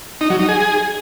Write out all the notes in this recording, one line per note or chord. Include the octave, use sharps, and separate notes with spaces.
D#4
F#3
D#4
G#4